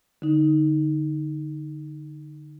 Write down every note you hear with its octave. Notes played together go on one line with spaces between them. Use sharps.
D3 D#4